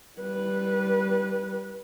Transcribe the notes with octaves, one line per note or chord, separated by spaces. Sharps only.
G3 B4